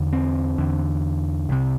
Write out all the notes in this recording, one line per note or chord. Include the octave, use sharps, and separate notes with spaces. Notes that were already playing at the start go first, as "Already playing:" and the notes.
Already playing: E2 D3
C4
E2 D3
C2 C3